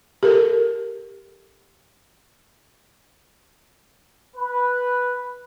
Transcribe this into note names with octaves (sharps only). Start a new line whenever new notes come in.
G4 A4 A#4
B4